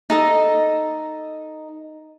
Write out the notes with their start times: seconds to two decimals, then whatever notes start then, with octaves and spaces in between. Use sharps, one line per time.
0.10 D#4 A4 D#5